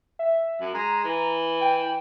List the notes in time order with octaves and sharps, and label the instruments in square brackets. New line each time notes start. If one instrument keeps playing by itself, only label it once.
[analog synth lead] E5
[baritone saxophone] F#2
[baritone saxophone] G#3 [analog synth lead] A#5
[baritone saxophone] E3
[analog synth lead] G5